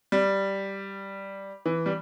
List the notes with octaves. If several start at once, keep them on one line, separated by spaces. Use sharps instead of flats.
G3
E3
G3